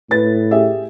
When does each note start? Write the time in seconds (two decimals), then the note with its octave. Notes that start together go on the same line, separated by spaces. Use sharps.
0.11 A2 B4 A6
0.51 G4 G#4 E5